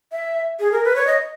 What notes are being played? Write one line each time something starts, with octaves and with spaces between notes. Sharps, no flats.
E5
G#4
A#4
B4
C#5
D#5